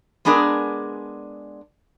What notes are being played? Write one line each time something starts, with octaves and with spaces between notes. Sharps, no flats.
G#3 B3 D4 G#4 A#4 D5